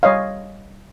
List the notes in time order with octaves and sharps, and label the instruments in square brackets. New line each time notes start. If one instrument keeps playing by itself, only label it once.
[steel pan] G3 C#5 D#5 F5